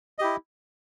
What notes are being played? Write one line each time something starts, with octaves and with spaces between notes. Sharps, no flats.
E4 G4 D#5